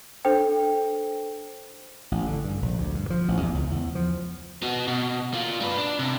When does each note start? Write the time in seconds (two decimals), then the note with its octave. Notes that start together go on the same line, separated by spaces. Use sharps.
0.25 D4 A4 C5 G5
2.12 A1
2.26 D3
2.44 G2
2.62 A#1
2.78 D2
2.95 G2
3.10 F3
3.28 A1
3.41 E2
3.54 C#2
3.71 E2
3.95 F3
4.62 B3 F#4
4.88 B2
5.34 A#3 F4
5.61 G3 B4
5.78 D4
5.99 C3